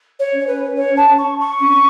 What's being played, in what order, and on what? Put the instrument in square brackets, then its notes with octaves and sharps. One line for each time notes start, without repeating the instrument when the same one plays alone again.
[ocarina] C#5
[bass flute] C#4
[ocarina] C#5
B4
C#5
A5
C#6
C#6
[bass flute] C#4
C#4